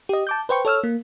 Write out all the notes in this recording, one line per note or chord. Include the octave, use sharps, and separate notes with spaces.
G4 D#5
A5 D6 G6
B4 C5 G5 C#6
A4 C#5 E6 F6
A#3